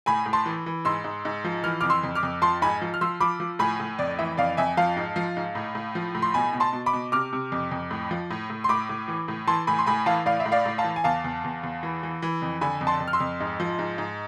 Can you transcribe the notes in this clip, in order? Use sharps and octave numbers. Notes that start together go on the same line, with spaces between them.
A2 G#5 B5
A2
A5 C6
E3
E3
G#2 C6 E6
G#2
G#2
F3
E3 F6
D6 F6
F2
C6 E6
F2
D6 F6
F2
F3 A5 C6
G#2 G#5 B5
F3
F6
F3 C6 E6
F3 B5 D6
F3
A2 G#5 B5
A2
F2 D5
E3 E5
F2 D5 F5
F2 E5 G#5
F3 F5 A5
G#2
F3
G#2
A2
A2
F3
A2
C6
B2 G#5 B5
B2
A5 C6
B2
B5 D6
B2
C3 D6 F6
C3
F2
F2
A2
F3
A2
A2
C6
A2 B5 D6
A2
E3
A2
E3 A5 C6
A2 G#5 B5
C6
A2 G#5 B5
E3 F5 A5
A2 D5 F5
E5
A2
D5 F5
A2
F5 A5
E3
G#5
E2 F5 A5
E2
E2
E2
E3
E3
E3
F2
D3 G#5 B5
F2
A5 C6
F2
F6
C6 E6
F2
G#2
F3
G#2
G#2